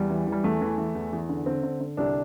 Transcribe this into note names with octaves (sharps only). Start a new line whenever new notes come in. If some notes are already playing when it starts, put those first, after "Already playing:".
Already playing: E2 G3
E3
E3
G3
E2 A3
E3
E3
E2
E2
D3
D3 C4
D3
D3
C2 D4